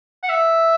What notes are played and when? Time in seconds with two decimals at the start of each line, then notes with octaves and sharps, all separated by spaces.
0.23 F#5
0.29 E5